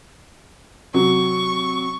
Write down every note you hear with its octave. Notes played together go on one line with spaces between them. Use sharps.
C3 F#3 C#6